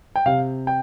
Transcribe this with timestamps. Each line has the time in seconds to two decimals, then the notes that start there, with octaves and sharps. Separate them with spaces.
0.16 G5
0.26 C3 F5
0.67 G5